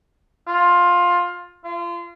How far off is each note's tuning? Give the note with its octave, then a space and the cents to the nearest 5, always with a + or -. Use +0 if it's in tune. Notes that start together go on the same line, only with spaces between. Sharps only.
F4 +15
F4 -30